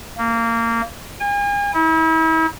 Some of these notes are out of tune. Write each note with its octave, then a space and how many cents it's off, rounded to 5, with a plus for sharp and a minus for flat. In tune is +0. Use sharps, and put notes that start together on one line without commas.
A#3 -20
G#5 -40
E4 -40